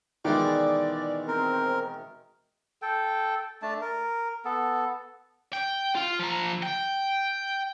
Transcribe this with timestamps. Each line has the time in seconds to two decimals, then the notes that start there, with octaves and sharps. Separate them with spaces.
0.25 B2 D#3 E3 G#3 D5
1.28 C4 A#4
2.82 A4 G5
3.62 A3 D4 A5
3.81 A#4
4.45 B3 A4
5.53 G5
5.95 F4 F5
6.19 F3 A#5
6.63 G5